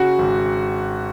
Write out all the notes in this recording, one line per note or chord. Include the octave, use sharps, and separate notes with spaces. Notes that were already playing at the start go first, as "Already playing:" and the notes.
Already playing: C#3 F#4
G#1